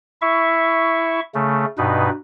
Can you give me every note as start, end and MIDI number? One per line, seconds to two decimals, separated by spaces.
0.22 1.20 64
0.22 1.20 76
0.22 1.20 85
1.35 1.65 49
1.35 1.65 57
1.78 2.10 43
1.78 2.10 47
1.78 2.10 63
1.78 2.10 71